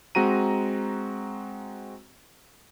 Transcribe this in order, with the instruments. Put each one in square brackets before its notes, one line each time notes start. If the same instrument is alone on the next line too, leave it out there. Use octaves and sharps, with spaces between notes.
[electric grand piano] G#3 C4 F#4 A#5 D#7